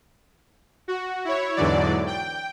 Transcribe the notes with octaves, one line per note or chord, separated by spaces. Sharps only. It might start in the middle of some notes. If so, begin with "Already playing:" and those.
F#4
E4 C#5
E2 G#2 D3 E3 F#3 D5
G5